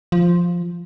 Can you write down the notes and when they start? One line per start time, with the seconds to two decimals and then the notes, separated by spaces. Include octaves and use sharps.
0.12 F3